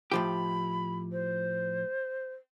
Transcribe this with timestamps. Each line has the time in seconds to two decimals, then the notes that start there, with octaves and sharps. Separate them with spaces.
0.12 A2 F3 G4 B5
1.12 C5